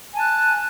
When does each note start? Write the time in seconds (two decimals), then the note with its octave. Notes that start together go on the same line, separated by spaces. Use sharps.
0.13 G#5
0.16 A5
0.20 F#6